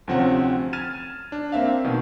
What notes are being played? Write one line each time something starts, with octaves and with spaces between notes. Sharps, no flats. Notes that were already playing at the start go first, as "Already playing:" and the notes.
D2 C3 F3 C4 C#4 F#5
F6 G#6 A6 D#7 E7
D4
A#3 C4 E5 F5
B2 D#3